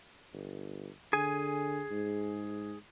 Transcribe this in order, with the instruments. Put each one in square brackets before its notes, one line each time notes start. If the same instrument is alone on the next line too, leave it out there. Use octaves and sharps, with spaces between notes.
[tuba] G1
[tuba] D3 [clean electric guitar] G#4 G#5
[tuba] G#2